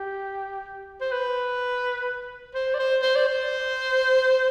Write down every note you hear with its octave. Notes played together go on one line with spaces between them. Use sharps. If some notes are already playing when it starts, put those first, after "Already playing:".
Already playing: G4
C5
B4
C5
D5
C5
C5
D5
C5